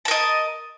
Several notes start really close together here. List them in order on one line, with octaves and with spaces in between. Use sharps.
A5 A#4 D#5